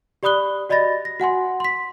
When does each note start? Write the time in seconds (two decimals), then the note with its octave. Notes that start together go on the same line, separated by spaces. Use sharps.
0.23 G4 D5 B5 D#6 F#6 G7
0.69 F#4 D5 D#5 B5 A6 A#6
1.05 A#6
1.20 F#4 F#5 G#5 C6
1.60 C6 B6